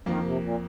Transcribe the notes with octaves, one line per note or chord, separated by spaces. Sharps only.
F2 D#3 F3 A#3
C3
A#2